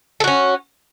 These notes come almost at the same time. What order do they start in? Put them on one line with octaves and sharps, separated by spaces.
A4 F#4 C#4